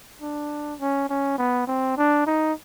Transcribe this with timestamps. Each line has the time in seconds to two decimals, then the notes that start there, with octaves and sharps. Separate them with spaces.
0.21 D4
0.80 C#4
1.09 C#4
1.38 B3
1.67 C4
1.97 D4
2.27 D#4